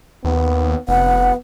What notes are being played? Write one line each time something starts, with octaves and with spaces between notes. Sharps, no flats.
D#2 B3
F1 B3 F#5